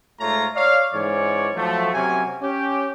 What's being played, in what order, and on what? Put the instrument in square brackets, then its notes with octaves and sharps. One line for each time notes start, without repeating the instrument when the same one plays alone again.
[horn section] G#2 A3 F4 C#5 A#5
C#5 D5 F5
G#2 E3 C#4 C#5 D5
F3 F#3 A3
C3 F#3 A#3 C#4 G#5
C#4 G4